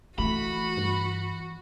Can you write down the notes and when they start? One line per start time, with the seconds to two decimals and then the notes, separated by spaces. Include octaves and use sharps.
0.18 E3 A3 F#4 B5
0.77 G2